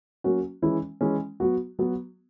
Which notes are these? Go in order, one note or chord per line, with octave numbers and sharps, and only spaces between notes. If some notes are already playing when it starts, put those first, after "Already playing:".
F#3 A#3 C#4 F#4
E3 G#3 C#4 E4
E3 G#3 C#4 E4
F#3 B3 F#4
F#3 B3 F#4